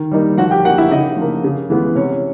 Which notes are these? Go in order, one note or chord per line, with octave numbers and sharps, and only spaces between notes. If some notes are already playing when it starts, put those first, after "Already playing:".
Already playing: D#3
G3 A#3 D#4
F3 F#4 F#5
G4 G5
A#3 D#4 F#4 F#5
E4 E5
C#3 D#4 D#5
F3 A#3
C#3
E3 G#3 B3
C3 C#4 C#5